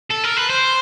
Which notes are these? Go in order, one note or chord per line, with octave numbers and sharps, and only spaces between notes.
A4
A#4
B4
C5